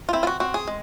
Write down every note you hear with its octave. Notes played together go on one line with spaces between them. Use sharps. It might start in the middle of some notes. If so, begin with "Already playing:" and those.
F4
C4 E4
F4
F#4
C4 F#4
G#4
G#3